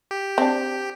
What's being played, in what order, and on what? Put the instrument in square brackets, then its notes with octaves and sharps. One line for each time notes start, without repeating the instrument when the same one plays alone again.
[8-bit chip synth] G4
[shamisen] C4 D4